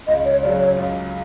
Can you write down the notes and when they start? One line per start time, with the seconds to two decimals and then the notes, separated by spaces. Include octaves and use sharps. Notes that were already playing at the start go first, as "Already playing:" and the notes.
0.07 C#2 D#5
0.25 C#5
0.42 C#3 F#3 D5
0.59 C#5
0.77 C#2